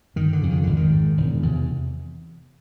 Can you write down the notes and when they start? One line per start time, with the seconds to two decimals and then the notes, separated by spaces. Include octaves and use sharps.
0.16 G1 D#3
0.33 D3
0.42 F2 C#3
0.50 D#3
0.63 G#1 D3
0.77 D#3
0.92 G#2
1.17 E1
1.43 E2 C3